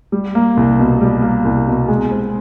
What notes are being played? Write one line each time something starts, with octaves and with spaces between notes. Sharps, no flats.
G3
A#3
C2
B2
G3
A#3
C2
B2
G#3
C4